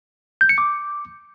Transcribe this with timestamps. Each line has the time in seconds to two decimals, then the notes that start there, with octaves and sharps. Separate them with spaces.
0.41 G6
0.49 C#7
0.58 D6